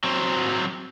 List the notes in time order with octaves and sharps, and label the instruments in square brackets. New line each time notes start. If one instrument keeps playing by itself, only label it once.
[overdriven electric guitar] F#3 C4